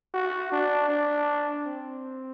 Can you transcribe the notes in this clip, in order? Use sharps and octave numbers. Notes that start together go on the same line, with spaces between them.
F#4
D4
D4
C4